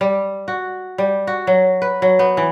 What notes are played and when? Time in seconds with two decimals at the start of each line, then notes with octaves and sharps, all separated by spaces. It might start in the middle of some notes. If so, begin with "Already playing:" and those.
0.01 G3
0.48 F#4
0.98 G3
1.27 F#4
1.47 F#3
1.82 B4
2.02 F#3
2.19 B3
2.37 E3